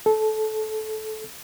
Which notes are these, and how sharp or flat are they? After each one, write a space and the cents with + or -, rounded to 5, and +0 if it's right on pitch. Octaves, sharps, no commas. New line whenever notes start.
A4 -20